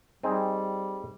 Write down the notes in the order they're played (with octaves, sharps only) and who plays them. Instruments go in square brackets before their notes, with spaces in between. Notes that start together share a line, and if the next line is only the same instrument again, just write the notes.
[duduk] G3 [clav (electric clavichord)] C4 D#4 G#4